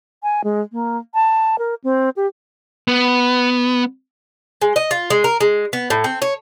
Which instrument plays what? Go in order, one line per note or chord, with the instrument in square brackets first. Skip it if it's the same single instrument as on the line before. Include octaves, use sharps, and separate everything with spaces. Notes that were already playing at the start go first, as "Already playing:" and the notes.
[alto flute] G#5
G#3
A#3
A5
A#4
C4
G4
[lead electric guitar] B3
[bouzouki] G#3
D#5
F4
G#3
A#4
G#3
B3
A2
C4
C#5